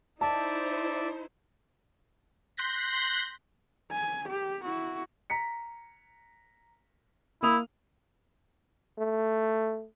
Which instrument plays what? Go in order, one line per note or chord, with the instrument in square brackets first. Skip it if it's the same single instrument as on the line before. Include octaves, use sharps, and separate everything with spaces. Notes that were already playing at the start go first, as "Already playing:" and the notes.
[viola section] D#4 E4 C5 [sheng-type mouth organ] D5 E5 [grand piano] A5
[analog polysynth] C6 F#6 G6 A#6 B6
[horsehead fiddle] G#5
G4
E4 F#4
[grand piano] A#5 B6 C#7
[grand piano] A#3 D#6 F7 [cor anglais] E4
[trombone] A3